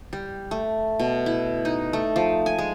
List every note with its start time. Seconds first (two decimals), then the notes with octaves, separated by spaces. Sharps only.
0.13 G3
0.51 A3
1.00 B2
1.26 E4
1.65 D#4
1.93 A3
2.16 F3
2.46 G#5
2.58 G#3